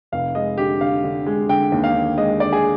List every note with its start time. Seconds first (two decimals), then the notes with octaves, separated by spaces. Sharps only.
0.12 F1 F5
0.35 G#3 D#5
0.58 D3 G4
0.81 D3 F5
1.04 D3
1.26 G#3
1.49 D3 G5
1.72 D#2
1.84 F5
1.95 D3
2.17 G#3 D#5
2.40 D3 D5
2.53 G#4